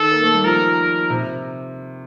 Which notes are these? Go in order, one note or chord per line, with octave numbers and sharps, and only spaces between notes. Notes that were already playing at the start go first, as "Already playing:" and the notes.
Already playing: D#3 A4
A#3
A3
G3
F3 A#4
C3